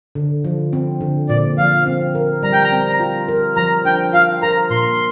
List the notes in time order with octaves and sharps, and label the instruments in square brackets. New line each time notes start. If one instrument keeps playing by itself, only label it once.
[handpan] D3
F3
C4
D3
[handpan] A#2 [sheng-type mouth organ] D5
[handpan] F3 [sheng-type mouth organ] F5
[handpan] C4
A#4
[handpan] G3 [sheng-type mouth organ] A#5
[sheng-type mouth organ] G5
A#5
[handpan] C4
F4
A#4
[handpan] F3 [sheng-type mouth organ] A#5
[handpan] D4 [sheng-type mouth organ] G5
[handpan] F4 [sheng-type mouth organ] F5
[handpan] A#4 [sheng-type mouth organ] A#5
[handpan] A#2 [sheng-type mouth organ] C6